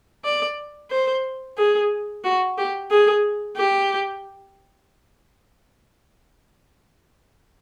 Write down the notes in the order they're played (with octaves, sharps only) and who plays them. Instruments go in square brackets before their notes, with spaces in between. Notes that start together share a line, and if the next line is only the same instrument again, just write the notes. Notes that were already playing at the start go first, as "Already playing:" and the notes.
[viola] D5
C5
G#4
F#4
G4
G#4
G4